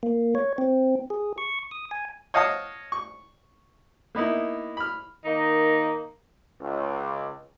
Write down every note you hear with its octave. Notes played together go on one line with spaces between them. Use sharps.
A#3
C#5
C4
G#4
C#6
D#6
G#5
C#5 D#5 F5 F#5 A5 D#6
C#6
A#3 B3 D#4 E4
B5 F6
D#3 A#3 D#4
C#2